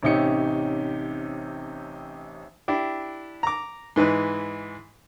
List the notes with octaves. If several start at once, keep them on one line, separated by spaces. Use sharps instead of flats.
A1 C3 C#4 D#4 G4 C#7
D4 E4 G4
A#5 D6
G#2 E3 D#4 B4